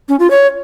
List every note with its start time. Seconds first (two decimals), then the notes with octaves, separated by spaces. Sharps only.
0.09 C#4
0.20 F4
0.30 C#5